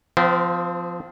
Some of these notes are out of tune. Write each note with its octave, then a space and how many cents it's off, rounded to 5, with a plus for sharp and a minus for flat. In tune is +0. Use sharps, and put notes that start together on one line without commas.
F3 +0 C4 -35